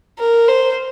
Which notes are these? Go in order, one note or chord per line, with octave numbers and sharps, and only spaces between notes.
A#4
C5